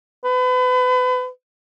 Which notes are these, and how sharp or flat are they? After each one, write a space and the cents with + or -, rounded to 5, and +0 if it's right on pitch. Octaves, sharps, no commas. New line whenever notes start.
B4 +35